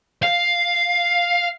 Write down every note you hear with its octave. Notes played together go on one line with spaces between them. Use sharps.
F5